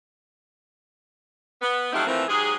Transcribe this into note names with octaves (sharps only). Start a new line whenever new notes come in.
B3
F3 F#3 A3 C4 D#4 G4
E3 F3 A3 A#3 C4
G#2 F#3 G4 G#4